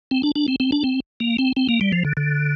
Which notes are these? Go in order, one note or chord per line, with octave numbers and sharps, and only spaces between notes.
C4
D4
D4
C4
C4
D4
C4
A#3
C4
C4
A#3
G3
F3
D3
D3